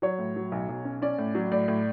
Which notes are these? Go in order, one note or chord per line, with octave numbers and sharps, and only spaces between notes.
F#3 C#5
A2
F#3
B1
B1
C#4
C#4 D5
A2
F#3
A2 D5
A2